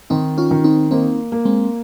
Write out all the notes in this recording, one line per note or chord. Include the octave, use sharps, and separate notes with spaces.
D#3 C4 D#4
C#4 F4
D#3
C4 D#4
A#3 C4 D#4
A#3
G#3 C4